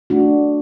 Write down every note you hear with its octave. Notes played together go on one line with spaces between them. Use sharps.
A3 D4 F#4